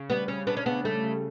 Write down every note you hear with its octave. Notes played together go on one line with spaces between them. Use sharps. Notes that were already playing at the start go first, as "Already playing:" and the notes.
Already playing: C#3
G3 B3
C#3 C#4
B3 D4
C#4
C#3 B3
G3 A3
C#3